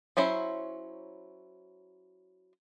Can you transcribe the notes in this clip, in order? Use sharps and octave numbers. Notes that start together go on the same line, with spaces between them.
F#3 C#4 E4 C5